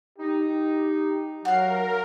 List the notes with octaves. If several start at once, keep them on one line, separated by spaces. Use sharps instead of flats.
D#4 G4
F#3 F#4 A#4 F5